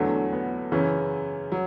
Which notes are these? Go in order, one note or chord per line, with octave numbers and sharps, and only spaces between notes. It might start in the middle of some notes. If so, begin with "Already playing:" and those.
Already playing: E2 D3 F#3 A3
B3
F#2 C#3 E3 C#4
F#3